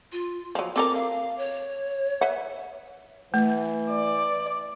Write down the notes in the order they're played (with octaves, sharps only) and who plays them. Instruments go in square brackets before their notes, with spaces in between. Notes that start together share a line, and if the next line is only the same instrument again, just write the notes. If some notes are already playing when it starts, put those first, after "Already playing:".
[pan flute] F4
[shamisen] F3 F#3
[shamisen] C4 A4 A#4 [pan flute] D6
[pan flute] F5
C#5
[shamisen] B4 E5 F#5
[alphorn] E3 [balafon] A3
[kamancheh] D5